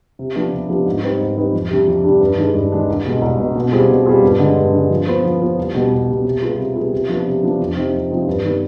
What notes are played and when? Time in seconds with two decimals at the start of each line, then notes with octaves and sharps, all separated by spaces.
0.19 C3
0.36 F3 B3 D4 G4
0.52 C3
0.69 F3 B3 D4 G4
0.86 G#2
1.03 G3 C4 D#4 B4
1.19 G#2
1.37 G3 C4 D#4 B4
1.53 F2
1.70 C3 G3 D4
1.87 F2
2.04 C3 G3 D4
2.21 G2
2.37 D#3 G#3 D4 G#4
2.54 G2
2.71 D#3 G#3 D4 G#4
2.89 C2
3.05 B2 G#3
3.22 C2
3.39 B2 G#3
3.55 B2
3.72 G3 C4 F4 G#4
3.89 B2
4.06 G3 C4 F4 G#4
4.23 G2
4.39 D3 G#3
4.56 G2
4.73 D3 G#3
4.90 F3
5.07 B3 F4 C5
5.24 F3
5.40 B3 F4 C5
5.58 C2
5.75 B2 G3
5.92 C2
6.08 B2 G3
6.25 C3
6.42 G3 B3 F4 G#4
6.58 C3
6.76 G3 B3 F4 G#4
6.93 C3
7.09 F3 B3 D4
7.26 C3
7.43 F3 B3 D4
7.59 F2
7.77 C3 F3 C4 D#4
7.93 F2
8.11 C3 F3 C4 D#4
8.27 G2
8.44 D#3 G3 B3